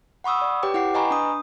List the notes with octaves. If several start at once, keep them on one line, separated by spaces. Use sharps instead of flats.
F#5 B5 C#6 D#6 E6
D5
G4 B4 C#5 G5 D6
E4 F#5 G5 D6 C7
B4 D#5 G#5 A#5 B5 C#6
D4 D#6